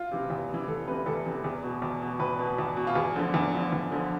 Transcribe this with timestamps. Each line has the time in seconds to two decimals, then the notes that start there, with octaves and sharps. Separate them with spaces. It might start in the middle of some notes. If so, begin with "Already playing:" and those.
Already playing: F4
0.11 C3 E3
0.30 E2
0.49 C3 E3
0.68 E2 A4
0.87 C3 E3 B4
1.06 E2 A4
1.26 C3 E3
1.44 E2 G#4
1.63 B2
1.82 E2
2.01 B2
2.20 E2 B4
2.39 B2
2.58 E2
2.77 B2
2.87 F4
2.95 E2 G#4
3.16 D3 F3
3.34 E2
3.53 D3 F3
3.72 E2
3.91 D3 F3